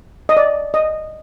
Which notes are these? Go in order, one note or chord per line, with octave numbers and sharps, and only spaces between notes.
D#5
D5
D#5